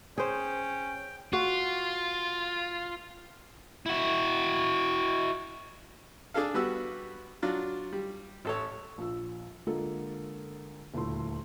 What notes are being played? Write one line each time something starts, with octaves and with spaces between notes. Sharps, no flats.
C#4 G#4 C5 G5
F4 F#4
E4 F#4
D4 G#4 A4 F5
G3 B3 F#4 E6
F#3 D4 F4
G3
A1 A4 C#5
A#1 F4 E6
D3 G#3 A#3 F4 A4
D#1 D2 A3 E4 C6